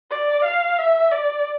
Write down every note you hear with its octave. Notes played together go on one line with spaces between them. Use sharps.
D5
F5
E5
D5